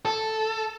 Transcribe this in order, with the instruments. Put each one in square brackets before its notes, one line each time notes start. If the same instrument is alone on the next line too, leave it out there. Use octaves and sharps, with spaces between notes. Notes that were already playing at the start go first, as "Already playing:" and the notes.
[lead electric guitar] A4